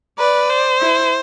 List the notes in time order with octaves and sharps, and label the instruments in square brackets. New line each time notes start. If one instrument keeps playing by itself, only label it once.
[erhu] B4 [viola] D5
[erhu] C5
[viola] E4